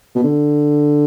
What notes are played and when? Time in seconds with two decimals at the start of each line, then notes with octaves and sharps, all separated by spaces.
0.15 B2
0.24 D3